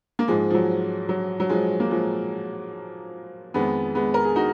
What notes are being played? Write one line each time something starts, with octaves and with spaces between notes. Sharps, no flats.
A#3
G#2 F3 G#3
F3
F#3
F#3
F#3
F3 G#3
A#3
F3 G#3
F2 D#3 G#3 B3
G#3 B3
A#4
G#4
D#4 F#4